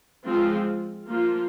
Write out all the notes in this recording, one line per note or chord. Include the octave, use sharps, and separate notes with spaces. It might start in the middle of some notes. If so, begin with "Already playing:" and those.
F3 G#3 C4 F4
F3 A#3 F4